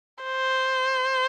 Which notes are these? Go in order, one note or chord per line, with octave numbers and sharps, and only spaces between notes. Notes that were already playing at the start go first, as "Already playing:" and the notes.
C5